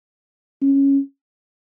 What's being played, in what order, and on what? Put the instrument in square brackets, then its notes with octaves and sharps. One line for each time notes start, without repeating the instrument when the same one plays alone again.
[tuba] C#4